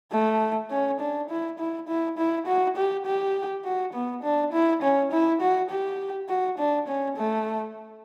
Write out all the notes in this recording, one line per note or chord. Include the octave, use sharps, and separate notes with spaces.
A3
C#4
D4
E4
E4
E4
E4
F#4
G4
G4
F#4
B3
D4
E4
C#4
E4
F#4
G4
F#4
D4
C#4
A3